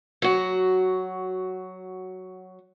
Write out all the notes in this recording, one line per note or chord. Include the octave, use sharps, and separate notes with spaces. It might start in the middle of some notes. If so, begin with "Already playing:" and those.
F#3 F#4